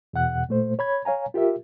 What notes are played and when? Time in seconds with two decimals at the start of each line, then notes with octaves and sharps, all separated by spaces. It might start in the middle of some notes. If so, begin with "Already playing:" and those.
0.13 E2 B2 F#5 F#6
0.49 A#2 A3 C5
0.79 C#5 B5 G#6
1.05 C#5 F5 G#5 A#5
1.34 F4 G4 A#4 E5